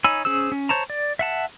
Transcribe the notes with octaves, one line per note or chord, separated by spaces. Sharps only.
D#4 C#5 G#5 B5 E6
C#4 G#4 C5 E6
C#4
C5 C#5 A5 A#5
D5
E5 F#5 A5